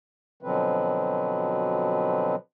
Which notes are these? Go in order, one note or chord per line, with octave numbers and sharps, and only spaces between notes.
B2 D3 F3 F#3 C4 B4